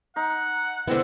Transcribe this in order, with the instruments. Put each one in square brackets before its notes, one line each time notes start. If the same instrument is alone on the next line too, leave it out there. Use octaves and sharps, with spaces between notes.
[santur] D#4 [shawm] F#5
[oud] D3 C4 E4 [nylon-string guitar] B3